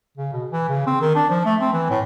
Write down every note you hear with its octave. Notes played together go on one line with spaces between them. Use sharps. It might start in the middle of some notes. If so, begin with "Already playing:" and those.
C#3
B2
E3
C#3
C4
D#3
D4
F3
A3
C4
E3
A2